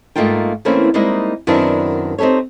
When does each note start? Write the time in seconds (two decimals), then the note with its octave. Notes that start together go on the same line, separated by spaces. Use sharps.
0.16 G#2 A3 A#3 D#4 F4 G5
0.65 E3 A3 A#3 C4 C#4 E4
0.94 G3 G#3 A#3 C4 D#4 E4
1.47 F#2 D#3 B3 C4 D4 E4
2.18 C4 D#4 G4 A4 C#5